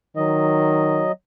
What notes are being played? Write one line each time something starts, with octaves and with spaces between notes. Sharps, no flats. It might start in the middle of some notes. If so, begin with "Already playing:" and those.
D#3 F#3 D#5